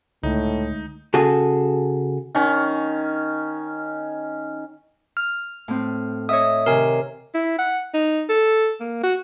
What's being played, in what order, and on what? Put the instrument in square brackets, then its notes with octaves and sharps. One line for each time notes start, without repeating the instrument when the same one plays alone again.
[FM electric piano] C#2 [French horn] A2 [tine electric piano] D3 G#3 A3 [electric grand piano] D#4
[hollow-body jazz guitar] C#3 F#4 G#4 A4
[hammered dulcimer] D#3 C#4
[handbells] F6
[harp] A2 C4
[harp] C#5 D#5 E5 [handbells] D#6
[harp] C3 D#3 [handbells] A#4 G#5
[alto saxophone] E4
F#5
D#4
A4
A#3
F#4